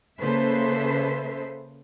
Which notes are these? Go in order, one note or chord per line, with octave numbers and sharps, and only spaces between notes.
C#3 A#3 A4 B4 C5 E5